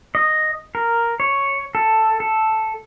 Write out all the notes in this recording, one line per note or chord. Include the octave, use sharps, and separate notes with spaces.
D#5
A#4
C#5
A4
A4